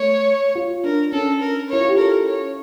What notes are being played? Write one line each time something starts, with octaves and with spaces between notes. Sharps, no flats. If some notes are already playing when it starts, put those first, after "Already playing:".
Already playing: A3 C#5
F4
D4 A#4
C#4 A4
A#4
E4 C#5
F4
G4
A4 A#4
C#5